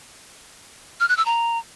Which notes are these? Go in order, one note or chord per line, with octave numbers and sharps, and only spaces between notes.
F6
F#6
E6
A#5